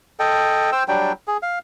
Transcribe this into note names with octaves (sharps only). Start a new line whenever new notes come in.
A4 D#5 G5
C5 G5 E6
F#3 G3 D4 G5
G#4
F5